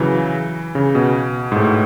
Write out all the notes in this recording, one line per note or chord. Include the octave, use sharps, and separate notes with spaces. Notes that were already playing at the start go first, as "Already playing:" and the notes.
Already playing: C#3 E3 F#3
C#3
B2
G#2
A2